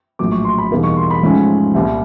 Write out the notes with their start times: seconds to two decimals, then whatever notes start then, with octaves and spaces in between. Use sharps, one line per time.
0.19 A#1 A2 F#3 D6
0.32 C#6
0.45 C6
0.58 B5
0.71 E2 B2 G3 A#3 D#4
0.83 C#6
0.97 C6
1.10 B5
1.23 G#2 F3 A3 C#4
1.74 C2 A#2 G3